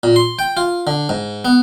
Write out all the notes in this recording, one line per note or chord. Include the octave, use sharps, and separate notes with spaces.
A#2
C6
G5
F4
D3
G#2
B3